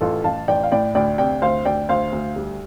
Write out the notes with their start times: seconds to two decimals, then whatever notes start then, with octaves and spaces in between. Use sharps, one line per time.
0.01 A1 F4 A4
0.24 A1 F5 A5
0.48 A1 D5 G5
0.63 F5
0.72 A2 D5 G5
0.95 D2 D5 G5
1.18 C3 D5 G5
1.42 D2 C5 F5
1.65 D2 D5 G5
1.89 D2 C5 F5
2.12 D2
2.36 G3